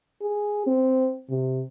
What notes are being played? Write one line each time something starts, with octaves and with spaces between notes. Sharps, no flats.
G#4
C4
C3